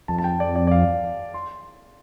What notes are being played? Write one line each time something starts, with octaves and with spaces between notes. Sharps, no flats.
F2 A5
A5
G5
D5
D5
D5
F5
C6